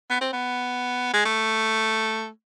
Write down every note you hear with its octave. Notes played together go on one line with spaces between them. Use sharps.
B3
C4
B3
G#3
A3